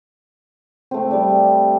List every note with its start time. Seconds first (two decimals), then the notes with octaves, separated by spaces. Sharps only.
0.91 A3 C4
1.11 G3 D5